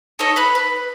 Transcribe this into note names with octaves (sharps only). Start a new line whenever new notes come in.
D#4 A4 C#5 D#5
B4 B5 F#6
B4